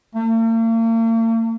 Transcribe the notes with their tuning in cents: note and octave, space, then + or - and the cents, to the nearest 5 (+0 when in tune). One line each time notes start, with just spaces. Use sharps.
A#3 -45